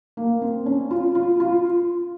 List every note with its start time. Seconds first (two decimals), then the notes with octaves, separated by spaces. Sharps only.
0.17 A#3
0.42 C4
0.66 C#4
0.91 F4
1.15 F4
1.40 F4